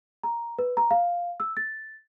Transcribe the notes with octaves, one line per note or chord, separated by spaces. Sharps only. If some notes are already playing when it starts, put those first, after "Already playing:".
A#5
B4
A#5
F5
E6
A6